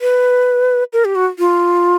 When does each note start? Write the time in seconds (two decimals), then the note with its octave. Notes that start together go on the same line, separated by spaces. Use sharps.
0.01 B4
0.93 A#4
1.05 G4
1.15 F#4
1.39 F4